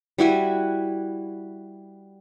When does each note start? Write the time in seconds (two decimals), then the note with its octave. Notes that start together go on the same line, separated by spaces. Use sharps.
0.18 G3 E4 F#4 G#5